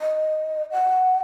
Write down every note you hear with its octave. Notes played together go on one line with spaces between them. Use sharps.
D#5
F#5